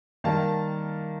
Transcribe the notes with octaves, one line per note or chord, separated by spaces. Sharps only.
D#3 G3 A#3 F5 A5